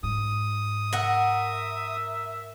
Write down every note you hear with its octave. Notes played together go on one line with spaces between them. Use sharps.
G#2 D#6
A#4 E5 F#5